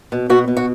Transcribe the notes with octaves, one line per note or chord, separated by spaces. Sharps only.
B2
B2 F#4
B2
F#4